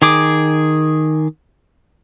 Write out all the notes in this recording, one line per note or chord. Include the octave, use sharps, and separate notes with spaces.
D#3 G#4 D6